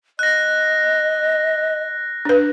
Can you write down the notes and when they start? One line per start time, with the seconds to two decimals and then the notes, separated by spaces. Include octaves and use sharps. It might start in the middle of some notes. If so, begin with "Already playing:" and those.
0.19 D#5 F#6 A#6
2.25 D4 B4